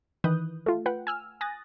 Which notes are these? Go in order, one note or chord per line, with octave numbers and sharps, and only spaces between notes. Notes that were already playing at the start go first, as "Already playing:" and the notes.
D#3 E3 B4 D#6 F#6 G6
A3 F4
F4 B4 F#5 G5
G#5 E6 F6
G#5 D#6 F#6 A6 A#6